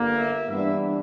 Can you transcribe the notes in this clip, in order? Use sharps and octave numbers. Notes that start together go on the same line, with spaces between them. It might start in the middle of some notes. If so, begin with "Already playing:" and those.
Already playing: G1 G2 D3 A#3
E5
G2 E3 B3 D4 E5